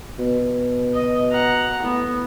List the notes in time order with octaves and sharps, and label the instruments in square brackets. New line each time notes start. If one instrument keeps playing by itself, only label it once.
[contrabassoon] B2
[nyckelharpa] D#5
F#5 A#5
[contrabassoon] A2 [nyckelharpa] B3